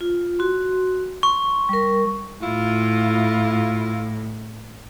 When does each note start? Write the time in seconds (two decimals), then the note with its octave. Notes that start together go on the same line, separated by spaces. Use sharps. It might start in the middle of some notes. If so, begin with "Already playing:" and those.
0.01 F4
0.39 F#4 C6
1.23 C6 C#6
1.69 G3 A#4
2.42 A2 E4 F4